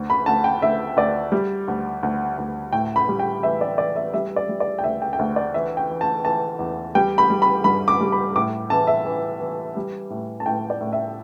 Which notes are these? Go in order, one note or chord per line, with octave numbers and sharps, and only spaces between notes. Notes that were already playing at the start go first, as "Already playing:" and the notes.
Already playing: D2
B5
D2 A5
G5
D2 E5
D2 D5
G3
D2
D2
D2
A2 G5
B5
G3
G5
E3 E5
D5
E3 D5
E5
G3 E5
D5
G3
D5
G5
D2 E5
G5
G5
D2 E5
D5
E3 E5
G5
E3
A5
E3 A5
E2
G3 G5
B5
G3
B5
G2 B5
D6
G3
B5
A2 D6
E3 A5
E5
E3
E3
G3
A2
A5
A2 G5
D5
A2
E5